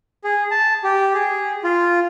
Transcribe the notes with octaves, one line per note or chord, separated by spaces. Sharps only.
G#4
A5
G4
G#4
F4